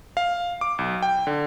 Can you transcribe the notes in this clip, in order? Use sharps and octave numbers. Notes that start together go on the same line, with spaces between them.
F5
D6
B1
G5
D3